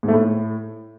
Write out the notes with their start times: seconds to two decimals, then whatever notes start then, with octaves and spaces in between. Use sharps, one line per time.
0.03 G#2
0.08 A3
0.14 A2